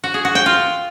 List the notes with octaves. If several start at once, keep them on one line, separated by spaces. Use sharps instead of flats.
F#4
G#4
F#4
G5
F4